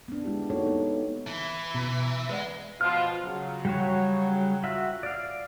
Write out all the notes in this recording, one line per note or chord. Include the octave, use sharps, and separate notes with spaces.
B3 D4
G#3 E4 G4
A#3 D#4 F#4 A4 C#5
G#3 B3
E3
B2 A#5 B6
G#3 B4 D5 F#5
B2 F3 F4 F6
C#3 F#3
G3 F#4 C#5
F4 F#4 E5
D5 F5